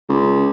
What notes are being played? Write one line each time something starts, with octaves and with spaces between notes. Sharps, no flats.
C#2